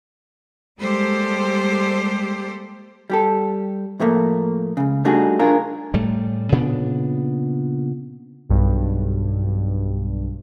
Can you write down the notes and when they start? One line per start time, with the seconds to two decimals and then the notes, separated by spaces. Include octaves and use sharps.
0.79 G3 G#3 A#3 G4 A4 C5
3.10 G3 G4 A4
4.00 A2 F3 A3 A#3
4.77 C#2 C#3
5.05 G3 A3 D4 D#4 F#4 G#4
5.39 D4 F4 G#4 A#4
5.94 A2 G3 A3
6.52 A#2 C#3 B3 D4
8.49 B1 G2